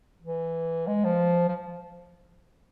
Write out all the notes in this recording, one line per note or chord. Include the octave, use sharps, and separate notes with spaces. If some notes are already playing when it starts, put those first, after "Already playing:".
E3
G#3
F3
F3